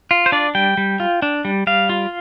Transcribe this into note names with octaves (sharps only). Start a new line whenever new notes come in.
F4
C5
D4 D5
G3 G5
G3
F4
D4
G3
G3 F5
F4